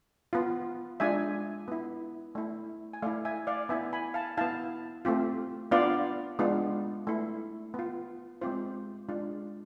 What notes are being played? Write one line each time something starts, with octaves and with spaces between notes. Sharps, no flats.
B3 F4
G#3 D4 F4 E5 G#5
B3 E4
A3 E4
G#5
A3 E4 D5 F5
E5 G#5
D5 F5
B3 E4 E5 G#5
G#5 B5
F5 A5
B3 E4 F5 A5
A3 C4 F4
B3 D4 F4 D5 F5
G#3 B3 D4 F4
A3 E4
B3 F4
G#3 C4 F4 C5 E5
G#3 D4 F4